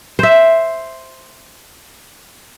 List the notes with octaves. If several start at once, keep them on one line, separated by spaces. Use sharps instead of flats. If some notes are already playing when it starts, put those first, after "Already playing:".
C5 E5